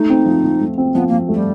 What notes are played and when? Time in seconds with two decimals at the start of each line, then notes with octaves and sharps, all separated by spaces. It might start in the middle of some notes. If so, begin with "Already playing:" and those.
Already playing: A3 D#4
0.10 C4
0.26 F3
0.44 F3
0.61 A3
0.78 C4
0.95 F3 B3
1.08 A#3
1.12 F3
1.29 A3
1.34 G3